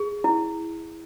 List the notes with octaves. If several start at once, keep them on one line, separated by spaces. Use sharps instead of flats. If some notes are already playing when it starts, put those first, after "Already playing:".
Already playing: G#4
E4